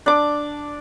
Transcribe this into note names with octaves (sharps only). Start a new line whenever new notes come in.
D4 D6